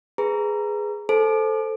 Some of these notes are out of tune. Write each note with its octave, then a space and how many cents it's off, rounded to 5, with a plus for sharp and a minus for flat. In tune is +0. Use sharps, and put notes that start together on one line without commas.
G#4 +0 B4 +5 A#5 +0
A4 +0 C5 +0 A5 -40